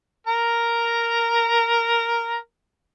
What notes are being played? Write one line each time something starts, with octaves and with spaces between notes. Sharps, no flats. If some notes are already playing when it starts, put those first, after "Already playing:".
A#4 A#5